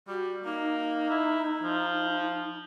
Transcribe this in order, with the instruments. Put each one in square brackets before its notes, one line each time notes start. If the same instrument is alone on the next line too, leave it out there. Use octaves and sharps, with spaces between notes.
[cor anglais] G3 [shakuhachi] F#4
[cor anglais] A#3 [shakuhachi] D#4
[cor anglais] E4
F3